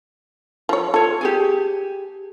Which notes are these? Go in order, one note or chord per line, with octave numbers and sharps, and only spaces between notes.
F3 C#5
F4 A4 C#5
G4 G#4 G#5